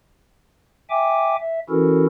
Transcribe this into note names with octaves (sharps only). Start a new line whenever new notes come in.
E5 G5 G#5 D6
E5
E3 C#4 E4 F#4 A4 A#4